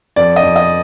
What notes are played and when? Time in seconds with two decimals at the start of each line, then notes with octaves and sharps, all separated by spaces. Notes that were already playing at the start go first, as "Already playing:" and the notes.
0.16 F2 D5
0.36 D#5
0.43 F2
0.56 D#5